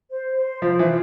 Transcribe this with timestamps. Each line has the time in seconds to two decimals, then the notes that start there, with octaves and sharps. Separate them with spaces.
0.10 C5
0.36 C5
0.62 F3 C5
0.79 E3
0.88 F4